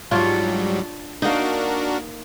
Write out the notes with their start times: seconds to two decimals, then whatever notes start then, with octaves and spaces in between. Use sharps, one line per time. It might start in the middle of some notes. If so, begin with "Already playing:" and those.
0.11 G#2 F#3 G3 D4 F4 C#5
1.22 A#3 D4 D#4 F#4 A#4